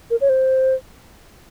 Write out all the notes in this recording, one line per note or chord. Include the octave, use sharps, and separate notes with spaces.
A#4
C#5
C5